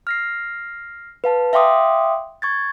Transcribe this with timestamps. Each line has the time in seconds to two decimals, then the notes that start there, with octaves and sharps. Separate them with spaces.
0.07 F6 A#6 C7
1.24 B4 F5 A5
1.53 E5 F5 G5 C6 D6 D#6
2.42 C#6 G#6 A6